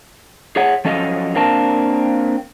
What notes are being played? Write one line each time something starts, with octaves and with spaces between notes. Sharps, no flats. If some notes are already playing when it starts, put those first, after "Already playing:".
G#4 C#5 E5 F#5
F3 F#3 C#4 A4 D#5 F5
A#3 C4 D4 A#4 F5 A5